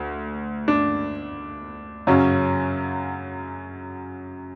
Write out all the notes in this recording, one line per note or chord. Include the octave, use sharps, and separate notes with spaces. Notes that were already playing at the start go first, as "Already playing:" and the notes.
Already playing: D2
D4
F#2 C#3 F#3 C#4